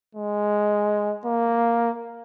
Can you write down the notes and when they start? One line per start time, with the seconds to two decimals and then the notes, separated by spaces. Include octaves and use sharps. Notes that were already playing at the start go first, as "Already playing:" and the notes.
0.15 G#3
1.25 A#3